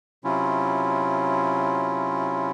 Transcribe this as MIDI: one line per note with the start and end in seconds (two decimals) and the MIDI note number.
0.24 2.51 48
0.24 2.51 54
0.24 2.51 61
0.24 2.51 64
0.24 2.51 65